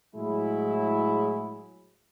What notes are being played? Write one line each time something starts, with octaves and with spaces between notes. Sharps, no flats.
A2 F#3 G#3 E4